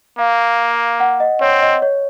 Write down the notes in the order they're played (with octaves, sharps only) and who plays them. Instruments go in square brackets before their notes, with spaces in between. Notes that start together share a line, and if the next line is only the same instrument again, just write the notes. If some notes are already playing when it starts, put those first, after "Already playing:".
[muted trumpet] A#3 [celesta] F5
[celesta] F#5
D#5
[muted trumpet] C4 [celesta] C#5
[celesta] D#5
C#5